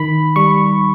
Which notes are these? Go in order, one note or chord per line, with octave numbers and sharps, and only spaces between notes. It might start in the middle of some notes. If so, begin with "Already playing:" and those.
Already playing: D#3 B5
G3 C#6